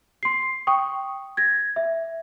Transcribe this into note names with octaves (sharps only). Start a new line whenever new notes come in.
C6 C7
G5 C#6 D#6
G#6 A#6
E5